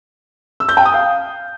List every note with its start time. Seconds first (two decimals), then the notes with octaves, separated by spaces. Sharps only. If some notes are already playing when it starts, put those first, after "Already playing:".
0.60 E6
0.69 G6
0.77 G5
0.85 D#6
0.94 F5